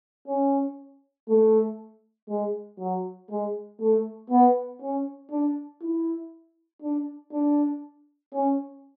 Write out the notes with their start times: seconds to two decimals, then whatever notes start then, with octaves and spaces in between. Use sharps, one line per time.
0.28 C#4
1.29 A3
2.29 G#3
2.80 F#3
3.30 G#3
3.81 A3
4.30 B3
4.82 C#4
5.31 D4
5.82 E4
6.83 D4
7.33 D4
8.34 C#4